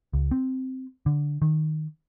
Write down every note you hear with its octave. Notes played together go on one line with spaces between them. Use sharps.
C#2
C4
D3
D#3